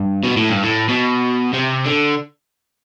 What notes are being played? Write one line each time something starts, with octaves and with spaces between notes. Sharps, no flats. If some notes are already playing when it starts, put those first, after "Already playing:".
Already playing: G2
B2
A2
G2
A2
B2
C3
D3